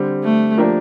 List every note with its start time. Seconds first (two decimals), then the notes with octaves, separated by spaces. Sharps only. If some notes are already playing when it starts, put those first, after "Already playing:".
Already playing: D3 G3 C4
0.24 A3
0.57 F3 A#3 D4 G4 A#4